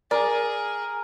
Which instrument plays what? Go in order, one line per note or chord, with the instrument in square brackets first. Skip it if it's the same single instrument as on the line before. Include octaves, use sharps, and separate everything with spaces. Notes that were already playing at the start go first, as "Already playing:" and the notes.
[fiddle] G#4 [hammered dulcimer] A#4 [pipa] D5